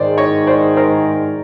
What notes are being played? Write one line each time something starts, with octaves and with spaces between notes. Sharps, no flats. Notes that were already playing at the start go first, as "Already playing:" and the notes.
Already playing: G#2 D#3 G#3 C5 D5
C#5 D#5
C5 D5
A#4 C5